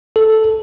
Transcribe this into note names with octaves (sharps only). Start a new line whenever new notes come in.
A4